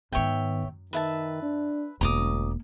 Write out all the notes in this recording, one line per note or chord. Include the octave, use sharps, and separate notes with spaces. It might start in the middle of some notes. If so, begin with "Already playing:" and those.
G#2 D#3 B3 C#5 E5 G5
F#2
D#3 B4 E5 A5
D4
E1 D2 G#3 A#3 A#5 D6 D#6